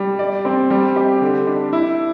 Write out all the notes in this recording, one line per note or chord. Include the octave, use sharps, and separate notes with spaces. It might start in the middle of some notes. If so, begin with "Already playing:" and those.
Already playing: G3
D5
C4
G3
G4
D3
D4
E4